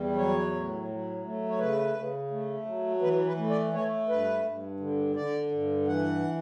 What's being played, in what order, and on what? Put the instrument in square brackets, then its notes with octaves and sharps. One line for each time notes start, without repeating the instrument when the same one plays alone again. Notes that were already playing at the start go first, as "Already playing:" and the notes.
Already playing: [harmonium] E2 G3
F#3 C#5
A2
F#3
A3
C#5
C#3 B4
C#3
A3
F#3
E3 B4
B4
A3
D5
A3 C#5
G2 B4
G2
D3
D3 D5
G2
E3 F#5